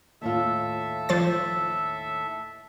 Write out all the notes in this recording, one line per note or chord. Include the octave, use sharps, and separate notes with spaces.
D#2 A2 F4 A4 E5 E6
F3 C5 A6